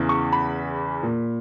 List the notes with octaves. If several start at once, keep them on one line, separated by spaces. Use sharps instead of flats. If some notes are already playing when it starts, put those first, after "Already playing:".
Already playing: E2 C#3 E3
C#6
B5
A#2